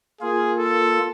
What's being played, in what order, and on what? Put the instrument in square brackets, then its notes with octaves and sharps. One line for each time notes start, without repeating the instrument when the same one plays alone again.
[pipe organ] A#3 F4 A#4 [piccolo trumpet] G#4
[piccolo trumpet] A4